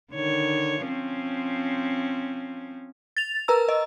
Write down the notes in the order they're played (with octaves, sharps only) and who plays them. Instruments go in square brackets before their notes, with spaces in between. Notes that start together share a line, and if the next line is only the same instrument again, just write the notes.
[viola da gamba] D3 D#3 C#5
F3 C4 C#4
[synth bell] A6 F7
A#4 B4 A#5 E6
D#5